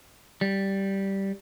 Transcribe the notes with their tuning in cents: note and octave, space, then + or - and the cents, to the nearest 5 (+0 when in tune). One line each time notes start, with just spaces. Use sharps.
G3 -5